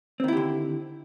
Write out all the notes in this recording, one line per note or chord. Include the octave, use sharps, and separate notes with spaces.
D3 D#3 C4 E4 G4